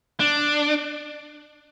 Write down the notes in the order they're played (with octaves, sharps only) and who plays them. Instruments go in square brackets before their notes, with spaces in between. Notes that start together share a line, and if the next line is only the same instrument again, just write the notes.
[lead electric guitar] D4